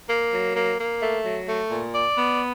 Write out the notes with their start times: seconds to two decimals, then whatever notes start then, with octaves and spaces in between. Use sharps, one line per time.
0.10 A#3
0.34 F#3
0.56 A#3
0.80 A#3
1.02 A3
1.25 F#3
1.48 A3
1.71 A#2
1.94 D5
2.18 B3